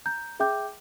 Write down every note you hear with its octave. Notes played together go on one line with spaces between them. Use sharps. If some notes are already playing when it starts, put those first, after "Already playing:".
A#5 G6
G#4 E5 G5 D6 G6